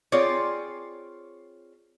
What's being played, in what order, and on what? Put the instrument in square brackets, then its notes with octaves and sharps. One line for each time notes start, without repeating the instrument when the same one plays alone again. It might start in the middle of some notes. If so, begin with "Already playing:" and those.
[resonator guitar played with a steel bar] C4 F4 G#4 C#5 D5